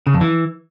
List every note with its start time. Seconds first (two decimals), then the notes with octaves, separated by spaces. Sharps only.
0.07 C#3
0.14 F2
0.21 E3